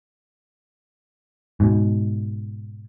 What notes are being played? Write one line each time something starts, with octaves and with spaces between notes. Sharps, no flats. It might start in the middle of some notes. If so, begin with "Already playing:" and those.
G#2 B2